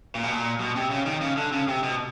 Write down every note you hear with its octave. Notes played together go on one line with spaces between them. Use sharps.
A#2
B2
A#2
B2
C3
C#3
D#3
C#3
D3
C#3
C3
B2